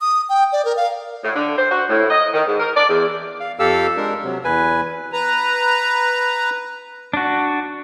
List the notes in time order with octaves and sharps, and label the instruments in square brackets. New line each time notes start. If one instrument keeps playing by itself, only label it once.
[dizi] D#6
G5
D5
A#4
F5
[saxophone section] A2
D3
C5
F#4
A2
D#5
D#3
G#2
A#4
D5
E2
[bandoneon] F5
F2 G4 A4 F5 E6
G#3 D4 A#4
C3 F#3
E2 B4 G#5
[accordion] B4 A#5
[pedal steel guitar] D4 F#4